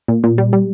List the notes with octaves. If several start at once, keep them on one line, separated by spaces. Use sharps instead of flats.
A#2
A#2
G3
G3